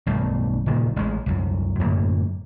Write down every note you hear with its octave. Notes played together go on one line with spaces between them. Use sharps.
B1 G2 D#3 A3
F#1 A#2 D#3
A1 G#3
C2 F#2
F#2 A2 D3 A#3